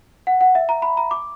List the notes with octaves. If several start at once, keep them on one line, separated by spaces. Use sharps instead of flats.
F#5
F#5
E5
A#5
B5
A#5
D6